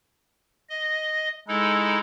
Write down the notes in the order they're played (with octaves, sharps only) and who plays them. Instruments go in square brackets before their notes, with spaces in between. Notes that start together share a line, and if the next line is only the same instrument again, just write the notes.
[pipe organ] D#5
[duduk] G#3 [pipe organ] D#4 E4 A4